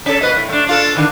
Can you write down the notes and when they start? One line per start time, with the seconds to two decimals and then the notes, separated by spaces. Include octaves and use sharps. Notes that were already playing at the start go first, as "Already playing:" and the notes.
0.06 C#4 A4
0.21 A#2 B4 D#5
0.36 A2
0.49 A3 D4
0.67 D4 F4 A4
0.95 D3 D#3 D4